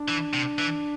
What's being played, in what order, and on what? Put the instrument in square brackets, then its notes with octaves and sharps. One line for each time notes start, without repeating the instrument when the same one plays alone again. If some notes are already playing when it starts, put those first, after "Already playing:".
Already playing: [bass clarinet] D4
[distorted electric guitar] E3
C3
E3